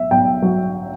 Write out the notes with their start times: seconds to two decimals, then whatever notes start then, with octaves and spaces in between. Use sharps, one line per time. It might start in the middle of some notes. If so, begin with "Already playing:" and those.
Already playing: B1 E5
0.11 B1 G5
0.42 F#3